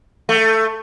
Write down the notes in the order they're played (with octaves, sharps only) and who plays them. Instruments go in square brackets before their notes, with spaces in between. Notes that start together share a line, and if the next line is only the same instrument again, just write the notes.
[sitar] A3